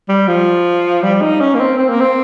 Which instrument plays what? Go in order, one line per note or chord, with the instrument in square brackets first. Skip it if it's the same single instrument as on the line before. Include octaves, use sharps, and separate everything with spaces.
[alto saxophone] G3
F3
G3
D#4
C#4
A#3
C4
C4
A#3
C4